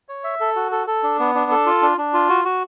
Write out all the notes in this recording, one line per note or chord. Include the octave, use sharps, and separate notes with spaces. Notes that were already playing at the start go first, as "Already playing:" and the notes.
C#5
E5
A4
F#4
A4
A4
D4
B3
D4
A4
F4
D4
D4
F4
F#4
F#4